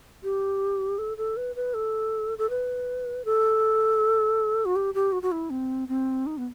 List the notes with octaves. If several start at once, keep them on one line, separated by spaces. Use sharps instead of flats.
G4
A4
A4
B4
B4
A4
A4
B4
A4
F#4
G4
G4
F#4
F#4
E4
C4
C4
D#4
B3